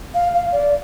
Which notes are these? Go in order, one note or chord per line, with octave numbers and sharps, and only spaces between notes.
F5
F5
D5